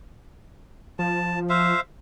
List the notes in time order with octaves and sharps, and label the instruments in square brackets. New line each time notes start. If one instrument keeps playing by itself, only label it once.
[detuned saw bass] F3 [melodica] A5
[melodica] C5 E5 F5